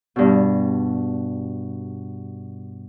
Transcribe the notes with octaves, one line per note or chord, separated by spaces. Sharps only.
G2 B2